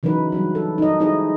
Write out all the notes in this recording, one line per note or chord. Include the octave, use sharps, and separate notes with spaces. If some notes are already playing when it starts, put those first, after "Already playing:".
C#3 E3 F#3 D#4 B4
F#3 G3 D4
A4
D#4 D#5
G#3 D#4 E4 G#4 C5 D#5